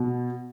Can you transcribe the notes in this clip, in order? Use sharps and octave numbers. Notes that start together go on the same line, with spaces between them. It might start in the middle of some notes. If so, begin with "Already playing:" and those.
Already playing: B2